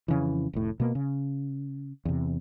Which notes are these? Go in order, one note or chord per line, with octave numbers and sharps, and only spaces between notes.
F2 C#3 E3
F1 A2
B2 A#3
C#3
E2 C3